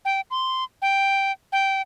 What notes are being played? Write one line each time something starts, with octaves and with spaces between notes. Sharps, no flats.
G5
C6
G5
G5